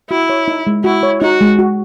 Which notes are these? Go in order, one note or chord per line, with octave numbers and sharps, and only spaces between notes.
E4 F#4
C#5
D#4
G#3
E4 F#4
C#5
D#4 F#4
G#3
F#4